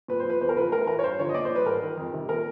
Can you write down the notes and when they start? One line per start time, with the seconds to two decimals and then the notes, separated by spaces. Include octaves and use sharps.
0.08 A#2 B4
0.20 C5
0.25 F3 B4
0.41 E2 C5
0.49 A#4
0.56 C#3 F3 B4
0.71 A2 A#4
0.87 E3 A#4
0.99 C#5
1.03 G2 C5
1.19 D3 F3 C#5
1.29 D#5
1.34 A#2 D5
1.45 C5
1.51 F3
1.56 B4
1.66 G#2 A#4
1.82 D#3
1.97 F2
2.13 C3 D#3
2.29 A#2 A#4